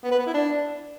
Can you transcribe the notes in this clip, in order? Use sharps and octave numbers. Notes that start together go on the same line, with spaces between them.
B3
B4
B3
E4
D4